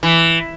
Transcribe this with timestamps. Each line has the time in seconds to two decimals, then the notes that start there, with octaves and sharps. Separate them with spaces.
0.03 E3